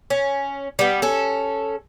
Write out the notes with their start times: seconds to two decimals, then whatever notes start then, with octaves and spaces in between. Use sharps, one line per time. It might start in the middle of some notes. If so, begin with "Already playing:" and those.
0.10 C#4
0.79 G3 B3
1.02 C#4 A4